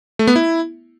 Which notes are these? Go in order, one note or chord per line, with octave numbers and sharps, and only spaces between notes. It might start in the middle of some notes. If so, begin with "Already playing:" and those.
A3
B3
E4